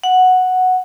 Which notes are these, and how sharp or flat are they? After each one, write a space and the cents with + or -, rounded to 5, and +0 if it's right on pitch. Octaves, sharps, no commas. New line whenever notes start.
F#5 -5